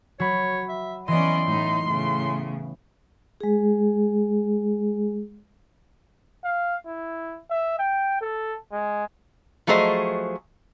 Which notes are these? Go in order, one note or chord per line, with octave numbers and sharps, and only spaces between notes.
F#3 C#5 B5
E5
E3 B3 C#4 D5 D#5 C6
A2 D#4
A2 C#3
G#3 G#4
F5
E4
E5
G5
A4
G#3
F3 F#3 A3 G#4 C5 D#5